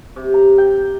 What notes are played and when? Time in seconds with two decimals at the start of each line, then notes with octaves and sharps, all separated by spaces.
0.16 C3
0.34 A#5
0.58 G5